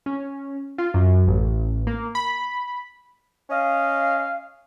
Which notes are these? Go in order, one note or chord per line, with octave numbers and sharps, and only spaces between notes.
C#4
F4
F#2
A1
A#3
B5
C#4 D#5 F5